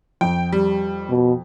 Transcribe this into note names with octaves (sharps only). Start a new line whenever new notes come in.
F2 G5
G3
B2